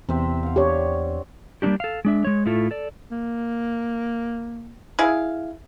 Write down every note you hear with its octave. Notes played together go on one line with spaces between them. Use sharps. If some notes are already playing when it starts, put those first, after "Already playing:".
E2 C3 C4 E5
F5 F#5
D4 G4 C#5
G3 A#3 C#4 D4 G4
A4 F5
G#3 D4 E5
G#3 C#5
A2 A3 E4 F4 A4
A4 D5
A#3
E4 G#4 F5